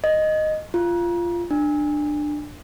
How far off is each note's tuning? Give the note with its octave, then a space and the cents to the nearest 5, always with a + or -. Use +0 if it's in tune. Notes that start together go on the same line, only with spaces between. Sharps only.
D#5 -5
F4 -15
D4 +20